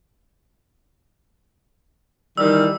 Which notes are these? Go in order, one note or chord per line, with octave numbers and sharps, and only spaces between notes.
D#3 E3 G3 E6